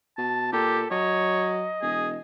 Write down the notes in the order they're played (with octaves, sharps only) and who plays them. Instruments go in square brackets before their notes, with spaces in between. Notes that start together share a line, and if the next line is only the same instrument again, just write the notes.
[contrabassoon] B2 [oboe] A5
[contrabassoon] A#2 [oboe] G4 [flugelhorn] A4
[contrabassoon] F#3 [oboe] C#5 [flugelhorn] D#5
[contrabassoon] E1 [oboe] G#4